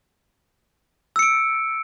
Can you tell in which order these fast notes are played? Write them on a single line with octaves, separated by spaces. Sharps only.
E6 C#7 D7